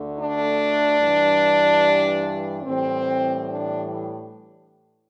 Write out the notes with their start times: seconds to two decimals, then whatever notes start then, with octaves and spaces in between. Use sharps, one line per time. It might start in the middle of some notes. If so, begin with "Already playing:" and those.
Already playing: D2 D3 A3
0.14 D4
0.98 G2 E3 G3
2.63 A2 E3 G3 C4
3.47 D4